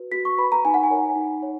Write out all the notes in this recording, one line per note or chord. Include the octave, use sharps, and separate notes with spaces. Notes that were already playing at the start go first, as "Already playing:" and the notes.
Already playing: F#4 B4
F#4 B6
C#6
B4 B5
A#5
D#4 G#5
F#5
G#5
A#4 C#5
D#4
C#5